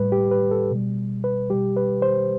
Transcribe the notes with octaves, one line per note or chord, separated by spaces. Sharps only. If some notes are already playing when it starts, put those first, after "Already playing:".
Already playing: A2 G3 B4
G4
B4
A4
B2 G3
B4
B2 G3 G4
B4
C5